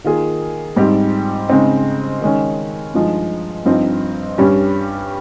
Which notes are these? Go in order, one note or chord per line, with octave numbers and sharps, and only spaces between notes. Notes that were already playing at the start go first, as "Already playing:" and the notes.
D#3 A#3 F4 G#4
G#2 G3 C4 G4
C#3 G#3 C4 D#4
D#3 G#3 C#4
G2 F3 G#3 D#4
G2 F3 C4 D#4
G2 G3 C#4 G4